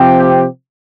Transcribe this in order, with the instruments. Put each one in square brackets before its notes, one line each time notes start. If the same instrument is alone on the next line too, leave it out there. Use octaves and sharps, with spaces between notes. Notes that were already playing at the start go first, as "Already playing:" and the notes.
Already playing: [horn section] C3 F3 C4 G4